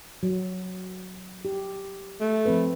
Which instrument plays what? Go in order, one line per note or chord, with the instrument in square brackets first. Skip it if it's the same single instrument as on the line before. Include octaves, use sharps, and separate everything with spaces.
[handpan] F#3
G4
[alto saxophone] A3
[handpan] F3 C4 B4